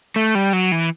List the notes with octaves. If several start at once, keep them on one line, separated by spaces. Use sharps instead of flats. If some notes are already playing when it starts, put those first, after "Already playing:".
A3
G3
F#3
E3